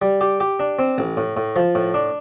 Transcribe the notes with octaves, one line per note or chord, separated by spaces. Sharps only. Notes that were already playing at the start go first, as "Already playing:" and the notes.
G3
G4
G4
D4
C4
A1
A2
A2
F3
A2
D4